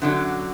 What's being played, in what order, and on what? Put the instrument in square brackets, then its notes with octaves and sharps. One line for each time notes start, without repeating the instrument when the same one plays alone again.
[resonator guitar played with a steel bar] F#2 D3 F#3